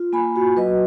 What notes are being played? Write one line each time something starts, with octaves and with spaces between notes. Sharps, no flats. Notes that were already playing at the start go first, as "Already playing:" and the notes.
Already playing: F4
A#3 G#5 B5
F#4
F#3 B4 D#5